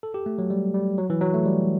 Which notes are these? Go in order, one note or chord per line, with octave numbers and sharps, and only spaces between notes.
A4
G4
A3
F#3
G3
G3
F#3
E3
F#3
A3
G3